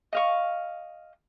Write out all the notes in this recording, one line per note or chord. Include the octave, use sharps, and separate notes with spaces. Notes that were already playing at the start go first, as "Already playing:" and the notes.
D#5 F5 C#6